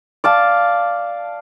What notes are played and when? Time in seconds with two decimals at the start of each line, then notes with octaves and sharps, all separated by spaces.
0.24 D5 F5 A5